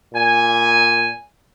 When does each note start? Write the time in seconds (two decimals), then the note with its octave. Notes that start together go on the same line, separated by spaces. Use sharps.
0.14 A#2 G#5